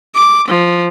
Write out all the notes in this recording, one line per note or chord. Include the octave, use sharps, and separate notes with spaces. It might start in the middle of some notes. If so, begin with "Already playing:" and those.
D6
F3